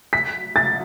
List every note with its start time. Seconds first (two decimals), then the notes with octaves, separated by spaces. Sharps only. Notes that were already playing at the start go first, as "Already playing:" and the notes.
0.13 B6
0.56 A6